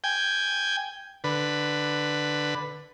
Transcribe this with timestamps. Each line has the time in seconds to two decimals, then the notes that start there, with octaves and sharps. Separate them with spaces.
0.04 G5 G#5
1.24 D3 B4